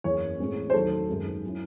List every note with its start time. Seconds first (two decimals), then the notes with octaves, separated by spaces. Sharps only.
0.04 F#1 E2 C#3 C#5
0.40 A1 A2 E3 G#3 C4
0.70 C5
0.73 D#2 D#3 F#3 A3 A4
1.09 G#1 F#2 D#3 G#3
1.44 F#3 C#4 E4